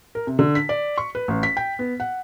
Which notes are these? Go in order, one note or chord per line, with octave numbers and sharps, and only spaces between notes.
A#4
C3
D3
B6
D5
C#6
B4
A1
B6
G5
B3
F#5